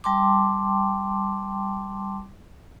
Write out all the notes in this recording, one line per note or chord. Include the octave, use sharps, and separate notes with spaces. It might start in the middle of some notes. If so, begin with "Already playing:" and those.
G3 G5 A5 C6 D6